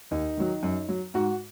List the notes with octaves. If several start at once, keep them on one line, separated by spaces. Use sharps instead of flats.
D#2 D#4
D#3 F#3
F#2
F#3
G#2 F#4